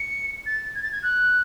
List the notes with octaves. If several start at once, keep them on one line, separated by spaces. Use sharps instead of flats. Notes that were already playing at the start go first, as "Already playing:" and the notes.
Already playing: C#7
A6
G#6
A6
G#6
F#6